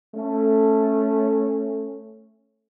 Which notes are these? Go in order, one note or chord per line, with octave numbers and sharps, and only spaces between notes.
A3 C#4